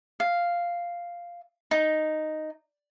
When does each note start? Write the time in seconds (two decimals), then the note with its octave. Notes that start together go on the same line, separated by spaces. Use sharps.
0.20 F5
1.71 D#4